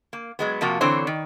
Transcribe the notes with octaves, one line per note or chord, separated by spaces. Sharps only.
A#3
F#3 G#3 B3
C3 F3 A#3 F4 F#4
D3 E3 C4 C5 C#5
D#3